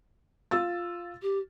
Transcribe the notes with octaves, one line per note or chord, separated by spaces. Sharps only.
F4 E6 A6
G4